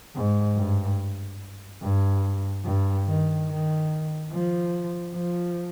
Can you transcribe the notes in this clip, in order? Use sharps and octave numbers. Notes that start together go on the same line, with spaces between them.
G#2
G2
G2
G2
D#3
D#3
F3
F3